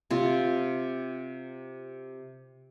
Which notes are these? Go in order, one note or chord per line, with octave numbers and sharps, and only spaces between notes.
C3 F4